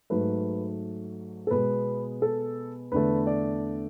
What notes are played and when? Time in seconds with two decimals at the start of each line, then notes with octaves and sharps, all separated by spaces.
0.10 G#2 F#3 A3 B4
1.47 A4
1.51 B2 G#3 B3 B4
2.22 A4
2.92 E2 D3 A3 B4
3.27 D5